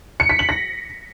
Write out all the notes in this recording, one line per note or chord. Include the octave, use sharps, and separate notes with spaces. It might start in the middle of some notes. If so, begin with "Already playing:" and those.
C#7
B6
F#7
A#6